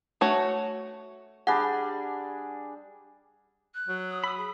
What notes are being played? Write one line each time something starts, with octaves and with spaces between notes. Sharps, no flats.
A3 F#4 C#5
G3 D4 G#4 F#5
F#6
F#3
D#6
B5 D#6 E6
G#4